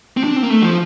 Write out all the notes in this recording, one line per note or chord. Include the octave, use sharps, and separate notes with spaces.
C4
D4
C4
A#3
A3
F3